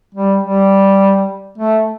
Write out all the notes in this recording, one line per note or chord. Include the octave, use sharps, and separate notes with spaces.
G3
G3
A3